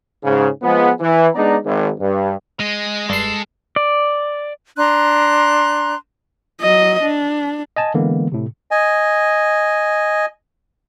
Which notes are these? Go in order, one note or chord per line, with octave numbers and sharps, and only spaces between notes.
G#2 C#3
F3 G#3 B3
E3
G#3 B3 D4 D#4 D5 A#5
G#1
G2
G#3 D#5
F1 G2 A4 C7
D5
D4 A#5 C6 F#6
F#3 D#5
D4
D#5 G#5 A5
D3 E3 G#3 A#3 B3
A2 C3
D#5 G#5